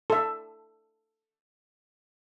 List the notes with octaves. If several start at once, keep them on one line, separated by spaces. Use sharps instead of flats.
A4 E5